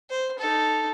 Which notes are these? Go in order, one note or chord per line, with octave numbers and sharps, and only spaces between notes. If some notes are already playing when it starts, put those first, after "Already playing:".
C5
D#4 A4